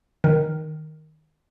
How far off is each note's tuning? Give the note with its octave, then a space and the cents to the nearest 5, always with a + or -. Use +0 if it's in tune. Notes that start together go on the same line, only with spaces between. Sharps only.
D#3 +0 A#4 +0